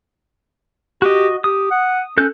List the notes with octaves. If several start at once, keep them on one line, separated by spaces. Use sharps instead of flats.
F#4 G4 D#5
G4 D#6
F#5
C#4 A4 F#6 G6